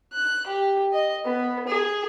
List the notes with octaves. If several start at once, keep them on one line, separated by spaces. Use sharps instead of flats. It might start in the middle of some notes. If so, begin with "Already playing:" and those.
F#6
G4
D#5
B3
G#4